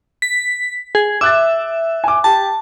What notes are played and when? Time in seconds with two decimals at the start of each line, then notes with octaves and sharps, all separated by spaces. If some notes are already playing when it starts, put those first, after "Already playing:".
0.22 B6
0.95 G#4
1.21 E5 D6 F#6 A6
2.04 G#5 D6
2.24 G4 A5